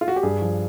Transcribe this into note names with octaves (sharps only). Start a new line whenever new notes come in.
F4
F#4
G4
G2 G#4
F3